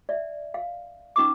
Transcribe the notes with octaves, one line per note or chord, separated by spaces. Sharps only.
D5 E5
F5
C#4 D#4 B4 C#6 D6